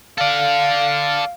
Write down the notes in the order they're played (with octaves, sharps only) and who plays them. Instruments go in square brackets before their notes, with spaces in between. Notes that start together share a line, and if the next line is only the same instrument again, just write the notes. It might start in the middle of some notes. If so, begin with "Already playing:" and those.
[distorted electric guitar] A4 D5 [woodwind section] F5